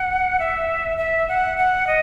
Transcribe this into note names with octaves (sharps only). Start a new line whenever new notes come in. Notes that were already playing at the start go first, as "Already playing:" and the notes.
Already playing: F#5
E5
E5
F#5
F#5
D#5